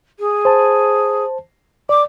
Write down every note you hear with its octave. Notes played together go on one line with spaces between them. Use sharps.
G#4
C5 A5
D5 D6